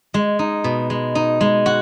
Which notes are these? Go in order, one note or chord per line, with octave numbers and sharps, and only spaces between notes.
G#3
D#4
B2
G#3
D#4
G#3
F#4